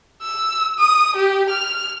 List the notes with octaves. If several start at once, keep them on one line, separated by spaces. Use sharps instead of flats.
E6
D#6
G4
F6